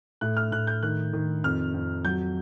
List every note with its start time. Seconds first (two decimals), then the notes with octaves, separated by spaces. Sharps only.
0.21 A2 F#6
0.37 F6
0.52 A2 F#6
0.67 G6
0.83 D#3 F#6
1.13 D#3
1.44 F2 F6
1.74 F2
2.04 F#3 G6